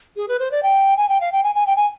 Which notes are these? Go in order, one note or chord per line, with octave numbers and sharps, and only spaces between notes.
G#4
B4
C5
D5
G5
G#5
G5
F5
G5
G#5
G#5
G5
G#5